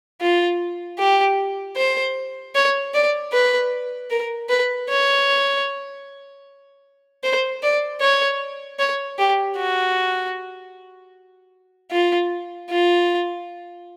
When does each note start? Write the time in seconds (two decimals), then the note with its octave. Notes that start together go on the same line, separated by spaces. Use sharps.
0.21 F4
0.99 G4
1.76 C5
2.55 C#5
2.94 D5
3.32 B4
4.10 A#4
4.49 B4
4.89 C#5
7.24 C5
7.63 D5
8.01 C#5
8.79 C#5
9.19 G4
9.57 F#4
11.91 F4
12.70 F4